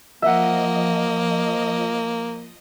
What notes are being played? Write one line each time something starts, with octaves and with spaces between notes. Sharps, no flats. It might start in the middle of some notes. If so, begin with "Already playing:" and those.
F3 A#3 D#5 E5 F#5